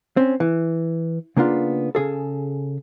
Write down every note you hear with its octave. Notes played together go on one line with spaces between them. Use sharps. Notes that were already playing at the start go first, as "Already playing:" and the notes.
C4 C#4
E3
C#3 A#3 B3 D4 F4
C#3 G#4 A4